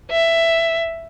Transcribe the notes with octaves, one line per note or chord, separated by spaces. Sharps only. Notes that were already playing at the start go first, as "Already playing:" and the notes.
E5